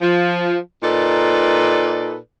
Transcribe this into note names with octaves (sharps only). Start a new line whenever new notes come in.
F3
A#2 D#4 A4 B4 D5